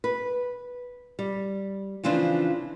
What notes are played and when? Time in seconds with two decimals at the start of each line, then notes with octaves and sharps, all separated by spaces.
0.04 B4
1.19 G3
2.03 C#3 E3 F3 C4 D4